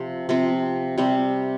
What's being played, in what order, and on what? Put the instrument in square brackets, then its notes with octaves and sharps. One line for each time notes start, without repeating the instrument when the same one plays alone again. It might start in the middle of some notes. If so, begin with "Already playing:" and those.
Already playing: [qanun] C3 F3 C4
C3 F3 C4
C3 G3 C4 G4